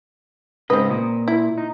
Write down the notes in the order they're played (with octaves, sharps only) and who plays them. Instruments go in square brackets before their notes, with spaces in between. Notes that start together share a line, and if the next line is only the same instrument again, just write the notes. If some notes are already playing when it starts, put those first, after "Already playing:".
[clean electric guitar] G#2 C#3 D#5 [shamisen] C4 B4
[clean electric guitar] A#2
[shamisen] E4
[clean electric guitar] D#4